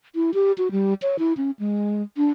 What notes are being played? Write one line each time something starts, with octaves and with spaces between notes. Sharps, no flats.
E4
G4
F#4
G3
C#5
E4
C#4
G#3
D4